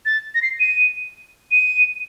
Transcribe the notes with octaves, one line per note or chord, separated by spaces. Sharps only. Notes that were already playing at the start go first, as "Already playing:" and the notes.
A6
A#6
C7
D#7
D#7